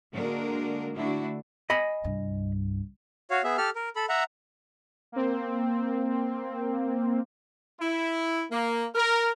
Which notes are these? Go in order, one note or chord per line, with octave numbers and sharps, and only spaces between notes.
D3 G#3 A#3 D4 F#4 A#4
D3 A3 D4 E4 F#4
D#5 G#5 B5
C2 G2
F#4 C#5 F5
B3 G#4 E5
G4 A4 F6
A#4
A4 B5
E5 F#5 A#5
A#3 C4
E4
A#3
A#4